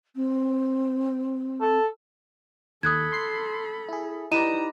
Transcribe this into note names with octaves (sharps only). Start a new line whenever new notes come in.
C4
A4
D#2 A4 B5 D#6 F#6 G#6
C6 C7
E4 G#4
D#4 E4 G4 B4 D5 A#5 D#7 E7